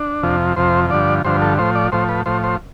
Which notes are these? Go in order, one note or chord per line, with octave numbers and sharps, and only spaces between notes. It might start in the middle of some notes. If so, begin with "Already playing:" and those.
Already playing: D4
F2 C3 F3
F2 C3 F3 C5
G2 D3 F3 D5
G2 D3 F3 C5
A4
A2 F3 C5
D5
A2 F3 C5
B4
A2 F3 C5
C5